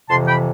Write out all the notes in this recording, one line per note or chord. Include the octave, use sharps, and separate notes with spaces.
F2 C3 E3 A5 C6
G5 B5